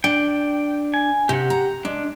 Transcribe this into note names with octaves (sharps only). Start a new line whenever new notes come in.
D4 G5
G#5
C3 G4 F#5
A#5
G#3 D4